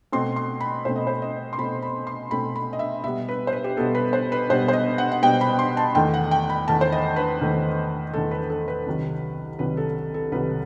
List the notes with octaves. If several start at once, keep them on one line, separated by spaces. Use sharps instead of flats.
B2 A3 C4 C6
C6
B5
B2 A3 C4 C5
D#5
C5
D#5
C6
B2 A3 C4 B5
B5
C6
B2 A3 C4 B5
B5
D#5
E5
B2 G3 B3 E5
B4
C5
B4
G4
B2 G3 B3 A4
B4
C5
B4
B2 G3 B3 C5
C5
D#5
F#5
F#5
B2 G3 B3 G5
B5
C6
A5
E2 D#3 A3 G5
F#5
G5
B5
E2 D#3 A3 A5
C5
D#5
B4
E2 D#3 A3
E2 D#3 A3 A4
B4
A4
B4
C2 C3 D#3 F#3
C2 C3 D#3 F#3 B4
A4
A4
C2 C3 D#3 F#3 B4